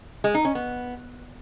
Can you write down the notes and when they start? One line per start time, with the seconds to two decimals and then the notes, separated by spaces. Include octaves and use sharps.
0.24 G#3
0.34 D#4
0.45 C#4
0.55 B3